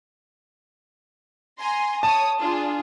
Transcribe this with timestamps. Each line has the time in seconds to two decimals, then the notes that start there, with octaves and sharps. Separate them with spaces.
1.59 G#5 A#5 C6
2.03 C#5 A5 D#6
2.40 D4 F4 G#4